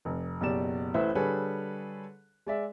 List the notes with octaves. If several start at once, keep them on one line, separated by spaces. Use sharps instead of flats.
F1
F#1 B2 G4 D5 E7
A1 A2 A3 B4 C5 E5
D3 G3 G#4 A4 B4 C#5
G#3 D5 E5